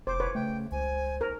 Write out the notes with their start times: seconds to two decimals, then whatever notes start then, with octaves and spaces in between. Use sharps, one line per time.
0.07 F1 C5 D6
0.20 B4 C#5
0.35 C#3 A3 G5
0.72 C#2 C5 G#5
1.21 A#4